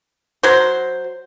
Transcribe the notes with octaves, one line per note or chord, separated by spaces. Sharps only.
F#3 C5